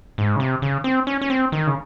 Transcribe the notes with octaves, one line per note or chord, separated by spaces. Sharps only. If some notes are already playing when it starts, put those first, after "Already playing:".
G#2
C#3
C3
C#3
C4
C#4
C#4
C4
D#3
C#3